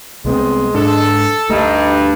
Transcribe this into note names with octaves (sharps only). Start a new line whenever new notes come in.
C2 G#3 B3 C4
G#2 D4 A4
D2 G2 A3 D#4